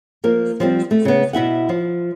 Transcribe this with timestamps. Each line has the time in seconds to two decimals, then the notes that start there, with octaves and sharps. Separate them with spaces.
0.24 F3 A#3 A#4
0.60 F3 G3 C4
0.91 A3
1.05 C#3 B3
1.33 B2 E4 E5 F#5
1.69 F3